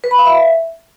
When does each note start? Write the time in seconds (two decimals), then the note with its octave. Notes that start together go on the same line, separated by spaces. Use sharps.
0.04 B4
0.11 B5
0.18 F5
0.26 E5